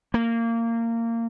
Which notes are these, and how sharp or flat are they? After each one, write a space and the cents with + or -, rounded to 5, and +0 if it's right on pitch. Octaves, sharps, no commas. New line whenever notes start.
A#3 -20